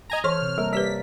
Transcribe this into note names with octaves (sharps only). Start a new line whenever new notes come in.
D#5 G#5 A#5
E3 A4 C5 C#5 C6 C#6 F6
C3
G3 A#3 A4 A#4
G3 G4 A4 B4 D5 B6